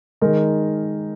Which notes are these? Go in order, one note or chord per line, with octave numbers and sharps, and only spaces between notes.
D#3 G#3 D#4 A#4